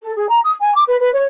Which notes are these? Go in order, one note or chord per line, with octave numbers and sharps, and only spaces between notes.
A4
G#4
A#5
D#6
G#5
D6
B4
B4
C#5